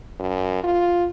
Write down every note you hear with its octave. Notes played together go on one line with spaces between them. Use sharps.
F#2
F4